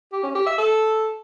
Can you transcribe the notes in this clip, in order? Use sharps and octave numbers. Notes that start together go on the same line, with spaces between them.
G4
C#4
G4
E5
A4